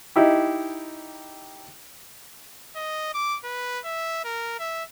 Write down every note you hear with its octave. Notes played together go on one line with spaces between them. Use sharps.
D#4 E4 G4
D#5
D6
B4
E5
A#4
E5